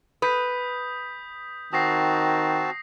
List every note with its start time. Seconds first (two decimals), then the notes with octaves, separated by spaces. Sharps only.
0.22 B4 D#6 G6 B6
1.73 D#3 C4 F#4 A5 D#6 A#6 C7